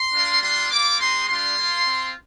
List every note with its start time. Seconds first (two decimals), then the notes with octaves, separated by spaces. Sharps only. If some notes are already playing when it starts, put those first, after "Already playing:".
Already playing: C6
0.12 A#3 D4 F4
0.41 G3 D4 F4 C6
0.69 A#3 F4 D6
0.98 G#3 C4 D#4 C6
1.27 G3 D4 F4 C6
1.56 A#3 F4
1.85 C4 F4